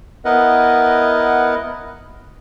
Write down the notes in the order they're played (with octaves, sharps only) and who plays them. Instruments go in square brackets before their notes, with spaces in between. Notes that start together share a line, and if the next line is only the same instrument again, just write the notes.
[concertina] B3 E4 A#4 B4 D#5 F#5